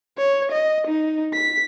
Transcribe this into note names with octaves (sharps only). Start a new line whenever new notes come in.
C#5
D#5
D#4
B6